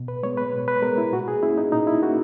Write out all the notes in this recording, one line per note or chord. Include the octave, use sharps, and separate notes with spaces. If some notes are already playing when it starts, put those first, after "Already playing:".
Already playing: B2
B4
G#3 B3 C#5
B4
B2
B4
G#3 B3 A#4
E4
A#2 F#4
G#4
A#3 C#4 E4
D#4
A#2 D#4
E4
A#3 C#4 F#4